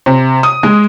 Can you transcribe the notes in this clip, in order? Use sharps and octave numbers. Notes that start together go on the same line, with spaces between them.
C3
D#6
G#3